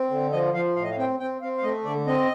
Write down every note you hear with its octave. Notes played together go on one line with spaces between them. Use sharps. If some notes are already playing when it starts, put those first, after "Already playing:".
Already playing: C4
D3
F3 D#5
F3 F5
A2 F5
D#5
F5
C4 G5
C4 G5
C4 F5
F5
A3 D#5
D3 D5
C4 D#5